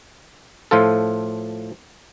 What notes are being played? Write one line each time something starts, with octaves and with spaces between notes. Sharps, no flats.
A2 F3 F4 A4